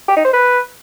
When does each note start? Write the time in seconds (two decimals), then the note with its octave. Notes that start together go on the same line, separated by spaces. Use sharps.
0.08 G4
0.17 D#4
0.25 C5
0.33 B4